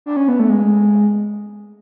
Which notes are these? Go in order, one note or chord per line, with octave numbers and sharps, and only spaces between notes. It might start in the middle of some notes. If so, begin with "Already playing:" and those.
D4
C#4
B3
A3
G#3